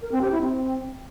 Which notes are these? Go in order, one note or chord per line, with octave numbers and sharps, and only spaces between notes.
A#4
C4
G4
E4
C4